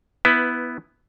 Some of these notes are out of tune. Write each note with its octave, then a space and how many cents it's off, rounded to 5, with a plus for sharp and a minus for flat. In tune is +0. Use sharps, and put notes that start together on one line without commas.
B3 +0 E4 +0 B4 +20